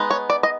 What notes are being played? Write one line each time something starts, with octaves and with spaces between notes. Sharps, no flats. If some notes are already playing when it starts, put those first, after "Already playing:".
Already playing: G#3 B3 D#4
C#5
D5
D#5